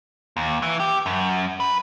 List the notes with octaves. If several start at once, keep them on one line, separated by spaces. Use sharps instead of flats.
D#2
E3
G4
F#2
B4